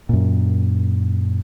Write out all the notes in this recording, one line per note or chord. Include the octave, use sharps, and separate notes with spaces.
F#2 A#2